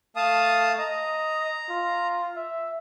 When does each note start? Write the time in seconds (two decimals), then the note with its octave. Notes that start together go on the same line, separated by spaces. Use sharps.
0.16 A3 F5 A5 D#6
0.78 D#5 A#5
1.70 F4
2.36 E5